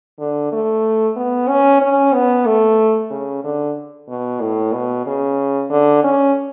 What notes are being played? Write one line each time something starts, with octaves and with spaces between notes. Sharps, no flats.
D3
A3
B3
C#4
C#4
B3
A3
C#3
D3
B2
A2
B2
C#3
D3
C#4